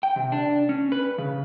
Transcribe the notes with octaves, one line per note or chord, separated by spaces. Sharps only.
G5
C3
D4
C#4
B4
C#3